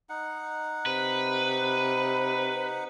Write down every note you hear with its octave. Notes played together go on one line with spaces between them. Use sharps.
D#4 F#5
C3 B4